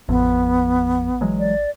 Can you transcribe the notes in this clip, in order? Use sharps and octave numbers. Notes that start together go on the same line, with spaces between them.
A1 F2 B3
E3 F#3 G#3
D5